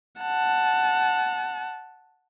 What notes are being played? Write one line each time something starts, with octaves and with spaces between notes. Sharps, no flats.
F#5 A5